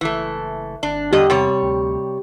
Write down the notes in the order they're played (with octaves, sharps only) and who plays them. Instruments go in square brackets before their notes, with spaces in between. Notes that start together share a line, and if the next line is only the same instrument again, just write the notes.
[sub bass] F#1 [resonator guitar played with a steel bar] E3 A3
[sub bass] G#1 [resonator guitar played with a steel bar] D4
[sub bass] E2 [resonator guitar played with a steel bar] G2 D3 D#5 [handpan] G4
[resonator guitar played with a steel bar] C3 G3 C#5
[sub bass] D2